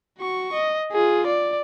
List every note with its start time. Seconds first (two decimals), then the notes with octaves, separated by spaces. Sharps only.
0.19 F#4 C#6
0.53 D#5
0.92 F4 G#4
1.27 D5